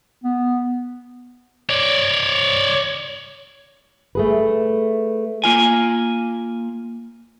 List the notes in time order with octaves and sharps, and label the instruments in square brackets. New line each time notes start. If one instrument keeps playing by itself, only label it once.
[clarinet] B3
[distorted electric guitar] C#5 D5
[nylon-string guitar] A3 G#4 B4
[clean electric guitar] A#3 F4 G#5